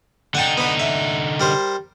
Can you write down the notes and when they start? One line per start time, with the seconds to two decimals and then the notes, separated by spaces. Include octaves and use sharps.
0.35 D3 D#4 F#5 G5 A5
0.58 B3 B4
0.79 E5
1.40 G3 A#4 C5